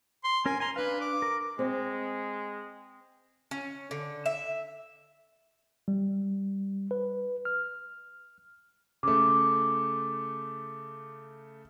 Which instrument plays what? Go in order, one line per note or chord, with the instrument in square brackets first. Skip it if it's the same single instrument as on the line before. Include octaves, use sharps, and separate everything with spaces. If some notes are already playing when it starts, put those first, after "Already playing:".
[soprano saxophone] C6
[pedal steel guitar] C#4 A#4 [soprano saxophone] G#5
[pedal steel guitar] G#5 A#5 [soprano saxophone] C6
[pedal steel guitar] D4 F5 [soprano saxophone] B4
[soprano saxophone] D6
[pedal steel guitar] A#4
[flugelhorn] G#3 [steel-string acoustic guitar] C4
[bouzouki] C#4
D3
E5
[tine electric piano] G3
B4
F6
[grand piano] C#3 A3 [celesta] D6